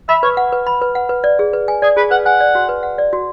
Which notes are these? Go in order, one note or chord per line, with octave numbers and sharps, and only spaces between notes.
E5 B5
B4 C#5
F#5
B4
B5
B4
F#5
B4
D5
G#4
B4
G#5
G#4 D5
G#4 B4
B4 F#5
F#5 G#5
D5
F#4
B4
F#5
D5
F#4